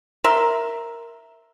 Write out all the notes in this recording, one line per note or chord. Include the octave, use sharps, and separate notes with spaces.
A#4 E5 C6